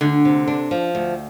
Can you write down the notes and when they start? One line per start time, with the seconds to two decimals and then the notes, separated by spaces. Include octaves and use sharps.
0.01 D2 D3
0.25 C3
0.47 D4
0.71 F3
0.95 D2